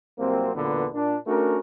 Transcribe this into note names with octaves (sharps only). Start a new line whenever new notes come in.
C2 F#3 A#3 C4
B1 E2 A#2 D3 B3 B4
A#2 D4
A3 C#4 D4 F#4 A#4